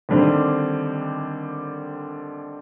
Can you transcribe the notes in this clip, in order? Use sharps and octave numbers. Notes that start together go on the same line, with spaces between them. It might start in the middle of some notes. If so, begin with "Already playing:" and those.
D#2 D3 G3 C4